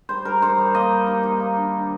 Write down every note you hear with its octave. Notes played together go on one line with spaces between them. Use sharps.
G3 C5
G3 A#4
D#4 C5
G3
A#3 D#5
G3
D#4
D#4
A#3
D4
D#3